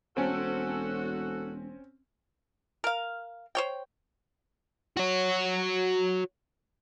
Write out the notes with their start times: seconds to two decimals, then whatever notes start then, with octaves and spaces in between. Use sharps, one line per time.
0.17 E1 C4 C#4 F#4 A4
2.84 A#4 F5
3.55 C5 C#5 G5
4.97 F#4 C#5